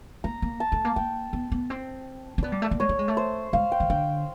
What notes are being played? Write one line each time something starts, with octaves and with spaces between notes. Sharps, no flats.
A#3 A#5
A#3
A5
A3
A#3
A#3 G5
B3
B3
C4
C4
B3 D5
G3
A3
A#3
G#3 C#5
A3
G#3
A3
C5
G#3 F5
G5
D#3
D3 G5